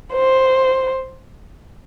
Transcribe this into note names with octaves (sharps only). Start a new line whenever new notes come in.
C5